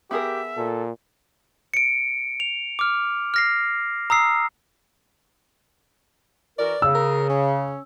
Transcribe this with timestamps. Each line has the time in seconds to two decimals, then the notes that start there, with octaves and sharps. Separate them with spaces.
0.11 B3 G4 G#4 A#4 E5
0.57 A#2 A4
1.74 C#7 D7
2.40 F7
2.79 D6 F6
3.34 F6 A#6 C7
4.10 A#5 D#6 E6 C7
6.58 E3 F#4 A#4 D5
6.82 C#3 E6
6.95 A#4
7.30 C#4